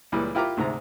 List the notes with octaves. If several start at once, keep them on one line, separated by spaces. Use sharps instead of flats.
C#2 A#2 E3 G3
E4 F4 G4 A#4 A#5 D6
D2 G#2 C3 A#5